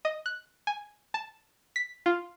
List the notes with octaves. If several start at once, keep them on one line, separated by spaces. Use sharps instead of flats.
D#5
F#6
G#5
A5
B6
F4